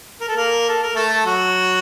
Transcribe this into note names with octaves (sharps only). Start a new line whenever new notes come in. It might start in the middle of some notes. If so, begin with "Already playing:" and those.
A#4
A4
A#3 A#4
A4
A#4
A3 A4
F#3 F#4